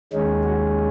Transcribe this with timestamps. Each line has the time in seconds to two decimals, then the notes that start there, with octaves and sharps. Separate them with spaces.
0.13 D#2 D#3 G#3 C#4 D#4
0.44 F#4